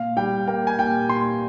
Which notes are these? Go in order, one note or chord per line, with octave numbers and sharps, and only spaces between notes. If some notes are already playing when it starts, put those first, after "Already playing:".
Already playing: A#2 F5
G3 G5
A#3 G5
G#5
A#2 G5
A#2 C6